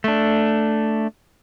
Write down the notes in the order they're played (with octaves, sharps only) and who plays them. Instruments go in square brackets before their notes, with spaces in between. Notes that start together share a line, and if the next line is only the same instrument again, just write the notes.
[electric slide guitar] A3 D4